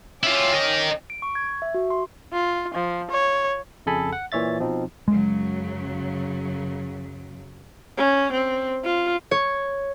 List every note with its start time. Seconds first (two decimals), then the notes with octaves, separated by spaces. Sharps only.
0.23 C#4 E4 F4 G5 D6
0.54 A#4 D#5
1.10 D7
1.22 C#6
1.35 G#6
1.62 E5
1.74 F#4
1.90 C6
2.32 F4
2.74 F3
3.10 C#5
3.86 F2 C#3 G#4 A4 G#5 B5
4.12 F#5
4.32 A#2 E3 C#5 E5 A6
4.59 B2 F3 C4 D#4
5.08 F#2 C#3 F#3 G#3
7.97 C#4
8.33 C4
8.84 F4
9.31 C#5